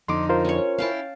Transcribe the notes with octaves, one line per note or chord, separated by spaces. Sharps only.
F2 D3 D#4 C6 D6
F4 A#4 C5
C#4 C#5
C#4 E4 F5 G5 A5